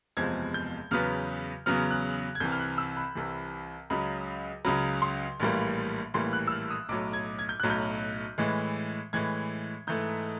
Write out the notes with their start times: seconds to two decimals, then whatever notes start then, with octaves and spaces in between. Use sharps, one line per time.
0.17 F#1 E2 C3 F3 G#3 G#6
0.54 G6
0.91 E2 C#3 F#3 B3 F6
1.66 E2 C#3 F#3 B3 F6
1.91 F#6
2.35 G#6
2.40 C2 C3 E3 G6
2.52 F6
2.60 F#6
2.78 E6
2.97 B5
3.15 C2 C3 E3
3.90 C#2 C#3 F#3 B5
4.65 C#2 C#3 F#3 B5
5.02 C6
5.40 A#1 A2 E3 G3 A#3
6.14 A#1 A2 E3 G3 A#3 C6
6.33 F#6
6.47 E6
6.52 F6
6.70 D#6
6.89 B1 A2 F#3 D6
7.13 G#6
7.39 G#6
7.49 G6
7.60 B1 A2 F#3 F#6
7.70 G6
8.38 A2 E3 G#3
9.13 A2 E3 G#3 G#6
9.87 G#2 E3 A3 G6